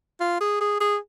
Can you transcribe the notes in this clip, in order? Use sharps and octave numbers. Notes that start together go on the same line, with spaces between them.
F4
G#4
G#4
G#4